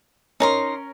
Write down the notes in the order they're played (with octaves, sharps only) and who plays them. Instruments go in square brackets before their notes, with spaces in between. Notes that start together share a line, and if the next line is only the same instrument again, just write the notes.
[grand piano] C#4 A#4 [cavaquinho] D#4 A#5 C6